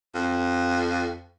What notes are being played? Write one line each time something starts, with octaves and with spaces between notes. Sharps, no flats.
F2